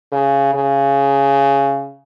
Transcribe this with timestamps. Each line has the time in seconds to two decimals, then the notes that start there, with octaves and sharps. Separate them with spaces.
0.12 C#3
0.55 C#3